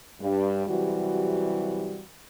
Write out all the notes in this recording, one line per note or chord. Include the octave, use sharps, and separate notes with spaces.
G2
C3 E3 F#3 G3 F#4